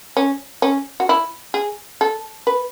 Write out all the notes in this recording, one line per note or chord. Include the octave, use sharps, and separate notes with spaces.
C#4
C#4
F#4
E4
G#4
A4
B4